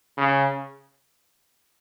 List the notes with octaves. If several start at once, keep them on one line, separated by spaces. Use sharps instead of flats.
C#3